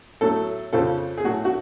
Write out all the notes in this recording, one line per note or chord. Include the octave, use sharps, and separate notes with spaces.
A2 F#3 A3 A4
F2 C#3 F3 A4
G#4
A2 F#3 A3 F#4
F#4